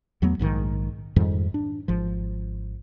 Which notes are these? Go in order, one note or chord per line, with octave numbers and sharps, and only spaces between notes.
E2 F#3 A3 B3
A#1 G#2 B2 D#3
F2 G#2 D#3 G3
D4
G#1 F3